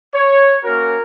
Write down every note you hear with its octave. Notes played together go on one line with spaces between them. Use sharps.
C#5
A#3 C#4 F#4 A#4